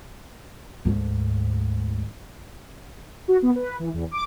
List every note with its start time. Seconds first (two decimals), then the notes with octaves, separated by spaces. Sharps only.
0.85 D2 G#2
3.28 F#4
3.42 B3
3.56 B4
3.79 E3
3.94 E2
4.11 D6